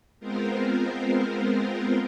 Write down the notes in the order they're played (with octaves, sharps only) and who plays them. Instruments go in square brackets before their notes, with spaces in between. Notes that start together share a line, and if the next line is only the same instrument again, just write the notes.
[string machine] G#3 B3 C4 F4 A#4 C5